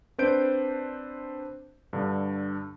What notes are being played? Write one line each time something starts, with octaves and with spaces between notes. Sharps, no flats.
C4 D4 B4 C5 G6 D7
G2 D3